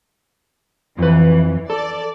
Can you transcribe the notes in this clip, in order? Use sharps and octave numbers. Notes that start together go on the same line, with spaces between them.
F2 E3 B4
A4 D5